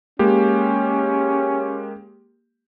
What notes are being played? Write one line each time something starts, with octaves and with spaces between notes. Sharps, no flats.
G#3 A#3 C#4 G4